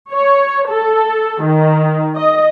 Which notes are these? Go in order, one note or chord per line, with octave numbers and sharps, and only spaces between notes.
C#5
A4
D#3
D#5